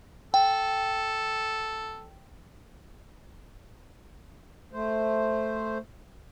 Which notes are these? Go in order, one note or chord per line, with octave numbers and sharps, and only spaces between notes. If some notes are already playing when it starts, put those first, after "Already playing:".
A4 G5
A3 C5